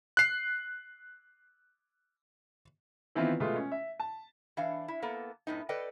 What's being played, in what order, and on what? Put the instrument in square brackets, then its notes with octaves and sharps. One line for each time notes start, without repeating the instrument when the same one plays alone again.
[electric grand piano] F#6 C7
[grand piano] D#3 E3 B3 C4 E4 F4
B2 G#3 A3 B3 F4
C#4
E5
A5
[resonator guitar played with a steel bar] E3 D4 F5
E4
A#3 B3 A4
F#2 A2 B3 D#4
A4 B4 D5 D#5 G5